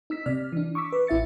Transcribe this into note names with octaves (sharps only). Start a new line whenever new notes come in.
D#4 E6 B6
C3 D5 F6
E3 D4
C#6 D6 E6 B6
B4
A1 E4 E5 A6 C#7